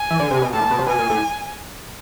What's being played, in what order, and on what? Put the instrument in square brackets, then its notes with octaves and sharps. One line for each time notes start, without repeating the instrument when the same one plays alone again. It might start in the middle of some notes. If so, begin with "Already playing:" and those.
Already playing: [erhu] G#5
[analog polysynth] E3
D3
C3
B2
[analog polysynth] A2 [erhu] A5
[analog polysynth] A#2
B2
C3
[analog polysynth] B2 [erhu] G#5
[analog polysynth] A#2
A2